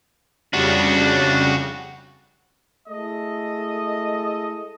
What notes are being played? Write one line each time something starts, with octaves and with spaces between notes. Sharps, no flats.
F2 C#3 G3 D4 F#4
G#3 A3 E4 A4 D#5